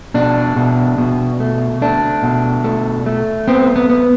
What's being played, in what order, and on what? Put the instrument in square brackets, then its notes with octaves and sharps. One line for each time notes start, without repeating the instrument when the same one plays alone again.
[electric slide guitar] B2 D4
B2
B2
A3
A3 D4
B2
A3
A3
B3 C4
B3
B3